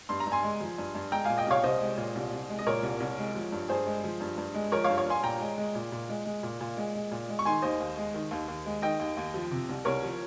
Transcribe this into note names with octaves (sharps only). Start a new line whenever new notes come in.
G2 C6
A#5
G2
G#5 C6
G#3
F3
G2
G2
G#3 G5 A#5
A#2 F5 G#5
D#5 G5
C2 C#5 F5
C2 C5 D#5
G#3
A#2
C2
C2
G#3
D#5
A#2 A#4 C#5
C2
C2
G#3
F3
G2
G2 G#4 C5
G#3
F3
G2
G2
G#3
F3 A#4 C#5
C#5 F5
G2
C#5 F5
G2 G#5 C6
A#2 G5 A#5
G#3
G#3
A#2
A#2
G#3
G#3
A#2
A#2
G#3
G#3
A#2
G#3
C#6
D#3 G#5 C6
D#2 C5 D#5
D#2
G#3
D#3
D#2
D#2
G#3
D#3 D#5 G5
D#2
D#2
F3
C3
C2
C2 A#4 C#5
F3